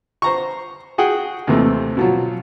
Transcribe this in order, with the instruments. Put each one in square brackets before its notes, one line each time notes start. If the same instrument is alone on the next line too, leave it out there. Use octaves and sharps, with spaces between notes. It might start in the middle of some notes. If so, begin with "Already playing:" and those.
[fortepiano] C5 A#5 C#6
F#4 G#4 F#5 G5
D#2 C3 E3 A3 C4
B2 F3 F#3